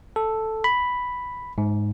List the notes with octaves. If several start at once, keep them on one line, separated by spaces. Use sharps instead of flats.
A4
B5
G#2